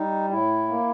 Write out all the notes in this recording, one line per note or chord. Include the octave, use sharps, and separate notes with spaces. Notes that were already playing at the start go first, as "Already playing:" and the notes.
Already playing: G3 D#4
A2 E4
A#3